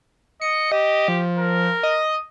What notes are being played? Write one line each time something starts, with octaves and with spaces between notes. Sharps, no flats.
D#5 C#7
G4 D#5
F3
A#4
D#5